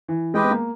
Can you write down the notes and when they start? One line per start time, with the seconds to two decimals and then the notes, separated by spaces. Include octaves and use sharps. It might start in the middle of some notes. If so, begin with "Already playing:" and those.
0.08 E3
0.34 G#3 G4 B4 D#5 G5
0.44 B3
0.51 A#3